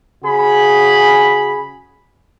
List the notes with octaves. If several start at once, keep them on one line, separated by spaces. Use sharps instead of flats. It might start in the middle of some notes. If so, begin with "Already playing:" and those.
C#3 F#4 G#4 B5